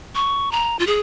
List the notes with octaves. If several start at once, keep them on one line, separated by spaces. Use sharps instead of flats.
C#6
A#5
F4
G#4